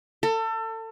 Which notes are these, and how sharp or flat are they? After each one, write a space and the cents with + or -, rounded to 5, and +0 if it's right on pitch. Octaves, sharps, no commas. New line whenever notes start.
A4 +30